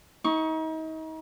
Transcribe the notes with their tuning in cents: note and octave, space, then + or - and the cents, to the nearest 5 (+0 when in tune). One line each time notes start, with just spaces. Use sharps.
D#4 +35 C#6 +0